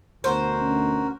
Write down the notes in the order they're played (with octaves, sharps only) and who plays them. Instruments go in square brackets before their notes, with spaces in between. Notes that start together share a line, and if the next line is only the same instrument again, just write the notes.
[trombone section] D2 B2 [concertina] F#4 A#4 [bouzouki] C5
[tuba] C#4